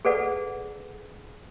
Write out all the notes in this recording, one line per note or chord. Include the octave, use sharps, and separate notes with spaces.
G#4 A4 B4 D5 F#5